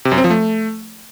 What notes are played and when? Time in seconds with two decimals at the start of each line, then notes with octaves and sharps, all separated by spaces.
0.05 C3
0.12 F#2
0.18 C4
0.24 F3
0.30 A3